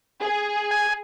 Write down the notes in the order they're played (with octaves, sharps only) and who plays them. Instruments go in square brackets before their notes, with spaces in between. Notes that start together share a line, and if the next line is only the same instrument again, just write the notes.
[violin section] G#4
[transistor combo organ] G#5